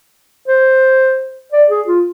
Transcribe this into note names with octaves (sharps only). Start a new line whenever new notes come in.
C5
D5
G#4
F4